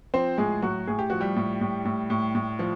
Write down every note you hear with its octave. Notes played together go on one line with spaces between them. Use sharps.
F3 C4 C5
A2 G#3 G#4
A2 F#3 F#4
A2 G#4
G4
F3 F#4
G3 G4
A2
A2
A2
A2
A2
F3